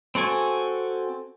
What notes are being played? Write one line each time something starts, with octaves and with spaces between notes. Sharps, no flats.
C4 F#4 A4 G#5